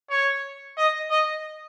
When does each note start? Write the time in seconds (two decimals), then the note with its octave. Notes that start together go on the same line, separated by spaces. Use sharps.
0.10 C#5
0.77 D#5
1.10 D#5